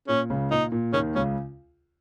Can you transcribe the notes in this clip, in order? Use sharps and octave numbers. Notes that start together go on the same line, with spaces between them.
A#2 C#4
C#2 C#3
A#2 D#4
A#2
D#2 D#3 C#4
C#2 C#3 C#4